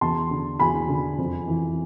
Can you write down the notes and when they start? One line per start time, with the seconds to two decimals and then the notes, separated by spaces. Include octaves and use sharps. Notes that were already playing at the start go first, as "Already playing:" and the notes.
0.01 E2 A5 C6
0.31 D3
0.60 E2 G#5 B5
0.89 D3
1.18 F2
1.48 E3